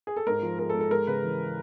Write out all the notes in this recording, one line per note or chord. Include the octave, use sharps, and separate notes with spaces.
G#4
A4
G#2 A#4
F3
G#3 A#4
A4
G#2
A4
G#3 A#4
C#3 B4
E3